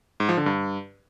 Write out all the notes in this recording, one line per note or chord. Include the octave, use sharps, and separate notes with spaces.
G#2
F3
D3
G2